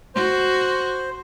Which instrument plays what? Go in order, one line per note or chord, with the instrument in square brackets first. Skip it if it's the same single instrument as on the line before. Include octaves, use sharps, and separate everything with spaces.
[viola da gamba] F#4 [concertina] C5